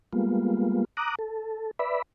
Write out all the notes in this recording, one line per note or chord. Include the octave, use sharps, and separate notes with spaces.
G3 G#3 A#3 B3 F4
A#5 D6 D#6 F#6
A4
B4 D5 E5 B5